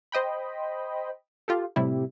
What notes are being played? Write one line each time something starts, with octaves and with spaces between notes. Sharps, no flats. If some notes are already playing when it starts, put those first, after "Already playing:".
C5 D#5 G5 B5
F4 G4 A4
A2 C3 G3 E4